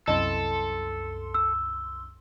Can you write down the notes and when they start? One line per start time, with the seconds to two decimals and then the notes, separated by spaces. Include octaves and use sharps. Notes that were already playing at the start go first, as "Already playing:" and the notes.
0.08 C2 F#2 C4 E4 A4 D#5 C6
1.34 E6